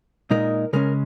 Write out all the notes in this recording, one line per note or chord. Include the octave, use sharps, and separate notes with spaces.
A#2 G#3 D#4 A#4
C#3 G#3 C#4 A#4